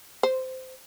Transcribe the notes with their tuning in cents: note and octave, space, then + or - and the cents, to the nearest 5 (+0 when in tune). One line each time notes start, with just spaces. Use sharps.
C5 -15